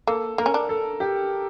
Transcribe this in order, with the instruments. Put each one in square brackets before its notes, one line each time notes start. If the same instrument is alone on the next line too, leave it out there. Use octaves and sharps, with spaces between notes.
[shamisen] A#3 [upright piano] A4
[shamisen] A#3 [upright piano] A#4
[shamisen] C#4
D4
[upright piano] A4
G4